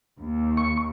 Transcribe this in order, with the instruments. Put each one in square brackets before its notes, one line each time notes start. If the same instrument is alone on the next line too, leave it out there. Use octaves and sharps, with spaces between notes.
[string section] D#2
[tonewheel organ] C#6